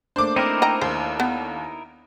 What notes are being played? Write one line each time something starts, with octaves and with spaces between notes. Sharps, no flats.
A3 A#3 D4 C5 D6
C4 D#4 E4 A#4
D#5 G5 A#5
D#2 C5
B3